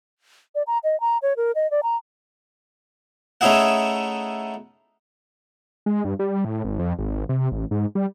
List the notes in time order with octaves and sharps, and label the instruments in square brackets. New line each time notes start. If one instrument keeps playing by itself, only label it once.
[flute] D5
A#5
D#5
A#5
C#5
A#4
D#5
D5
A#5
[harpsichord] A3 C#4 D#4 E4 G#4 F#5
[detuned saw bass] G#3
G2
G3
A2
G#1
F2
G#1
C3
A1
G#2
G3